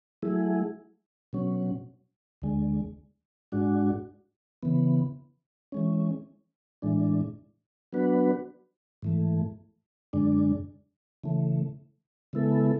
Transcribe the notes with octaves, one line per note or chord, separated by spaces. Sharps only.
F#3 A3 E4 G#4
B2 F#3 C#4
D2 D3 G#3
G#2 G#3 D4 F#4
C#3 E3 B3
E3 G#3 C#4
A2 E3 G#3 D4
F#3 B3 D4 F#4 B4
G#2 E3 A3
F#2 D3 G#3 D4
C#3 E3 A3
C#3 G#3 B3 E4 A4